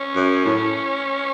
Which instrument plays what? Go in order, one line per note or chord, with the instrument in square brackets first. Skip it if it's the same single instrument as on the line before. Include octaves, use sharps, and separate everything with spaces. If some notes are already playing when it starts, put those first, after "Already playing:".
Already playing: [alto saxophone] C#4
[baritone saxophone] F#2
A2